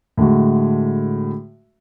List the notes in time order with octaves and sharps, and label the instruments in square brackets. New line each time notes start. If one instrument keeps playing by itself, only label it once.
[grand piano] A2 D3 G#3 F#4